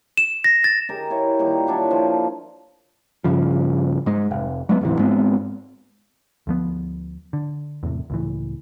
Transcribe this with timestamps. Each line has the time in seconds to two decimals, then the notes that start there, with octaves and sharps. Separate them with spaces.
0.17 E7
0.44 A#6
0.64 A6
0.89 G4 G#4 A#4 D#5
1.10 E4 C#5
1.39 A#2 D#3 G3 A#5
1.67 F#3 D4 E4 C#5
1.91 F3
3.24 G2 C#3 F3
4.06 G#2 G#3
4.31 F1
4.69 F#3 G#3 A#3 B3
4.81 D1 G#2 C3 E3
4.99 G#2 G#3 B3 C4
6.47 D2 F3 B3
7.33 D3
7.83 E2 A2 C3
8.10 C#2 A2 E3